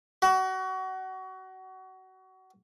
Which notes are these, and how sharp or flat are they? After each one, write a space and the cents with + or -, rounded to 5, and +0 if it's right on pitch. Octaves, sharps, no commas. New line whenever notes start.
F#4 +25